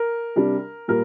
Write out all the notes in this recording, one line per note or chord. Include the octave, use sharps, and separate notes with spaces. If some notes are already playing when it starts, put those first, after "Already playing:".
Already playing: A#4
C3 G3 D4
A#2 G3 A#4